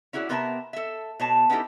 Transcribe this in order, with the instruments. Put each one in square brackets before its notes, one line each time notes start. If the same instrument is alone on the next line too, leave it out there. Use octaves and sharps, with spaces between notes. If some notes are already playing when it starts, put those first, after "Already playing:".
[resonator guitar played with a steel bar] C#4 E4 F#4 G#4 D5
C3 B3 A#4 E5 G5 A5
A4 E5
B2 C#5 A5
B3 C#4 D#4 E4 G4 A4